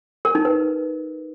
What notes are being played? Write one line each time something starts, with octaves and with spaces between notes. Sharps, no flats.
A#4
D#4
B4